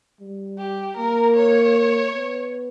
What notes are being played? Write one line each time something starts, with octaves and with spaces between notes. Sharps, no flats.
G3
G4
A#3 A#4
C#5
B3